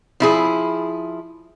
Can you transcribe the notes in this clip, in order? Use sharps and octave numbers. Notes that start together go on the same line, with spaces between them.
F3 E4 G#4